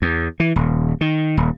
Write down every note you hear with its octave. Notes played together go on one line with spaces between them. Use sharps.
E2
E3
D#1
D#3
D#1